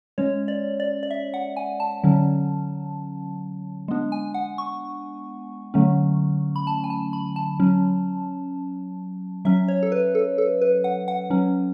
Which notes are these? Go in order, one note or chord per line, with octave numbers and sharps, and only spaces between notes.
G#3 C#4 C#5
D5
D5
D5
E5
F#5
G#5
A5
D3 F#3 C#4
G#3 B3 D4
G#5
F#5
C#6
D3 F#3 A3 C#4
B5
A5
G#5
A5
B5
A5
F#3 C#4
F#3 C#4 E5
C#5
A4
B4
A4
A4
B4
F#5
F#5
F#3 C#4